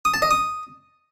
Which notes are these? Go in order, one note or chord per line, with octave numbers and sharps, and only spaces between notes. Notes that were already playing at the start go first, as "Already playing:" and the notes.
D#6
A5
D#5
D#6